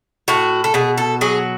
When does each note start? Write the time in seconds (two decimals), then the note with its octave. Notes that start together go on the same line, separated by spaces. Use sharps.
0.28 A2 F#4
0.64 A4
0.74 B2 G#4
0.98 A4
1.21 F#3 G#4